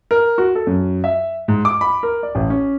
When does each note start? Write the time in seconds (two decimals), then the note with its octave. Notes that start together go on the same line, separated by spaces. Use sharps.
0.11 A#4
0.38 F#4
0.55 A4
0.67 F#2
1.04 E5
1.48 G#2
1.65 D6
1.81 B5
2.03 A#4
2.23 D5
2.35 A1
2.50 C#4